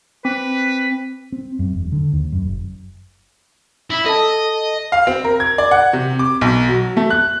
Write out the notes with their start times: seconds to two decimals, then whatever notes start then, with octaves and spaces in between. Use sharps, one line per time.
0.25 C4 B4
1.32 C4
1.59 F#2
1.73 E1
1.92 D3
2.13 D#2
2.32 F#2
2.45 F#1
3.91 E4
4.06 A4 D#5 A5
4.92 F5
5.07 C4
5.24 A#4
5.40 G#6
5.58 D5
5.71 F#5
5.93 C3
6.19 D6
6.41 B1
6.69 F#3
6.97 A3
7.10 F#6